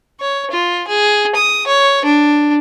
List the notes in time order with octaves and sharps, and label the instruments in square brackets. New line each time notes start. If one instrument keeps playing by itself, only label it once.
[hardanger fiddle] C#5
F4
G#4
D#6
C#5
D4